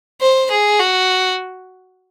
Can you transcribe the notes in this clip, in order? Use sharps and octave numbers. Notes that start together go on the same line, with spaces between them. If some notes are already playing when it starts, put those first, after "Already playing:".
C5
G#4
F#4